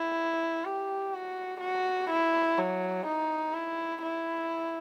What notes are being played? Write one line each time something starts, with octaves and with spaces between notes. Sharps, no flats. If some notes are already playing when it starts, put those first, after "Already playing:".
Already playing: E4
G4
F#4
F#4
E4
F#3
D#4
E4
E4